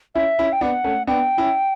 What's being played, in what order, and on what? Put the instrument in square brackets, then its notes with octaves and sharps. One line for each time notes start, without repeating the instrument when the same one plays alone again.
[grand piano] C#4 E4 [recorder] E5
[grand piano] C#4 E4
[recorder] G5
[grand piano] B3 D4 [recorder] F#5
[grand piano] A3 C#4
[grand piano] B3 D4 [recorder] G5
[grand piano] C#4 E4